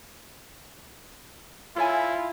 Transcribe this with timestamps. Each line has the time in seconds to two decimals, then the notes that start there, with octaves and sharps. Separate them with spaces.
1.76 E4 F4 A4 C#5 G#5